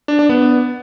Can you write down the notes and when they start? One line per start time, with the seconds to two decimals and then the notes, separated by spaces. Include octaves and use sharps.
0.08 D4
0.19 D4
0.29 B3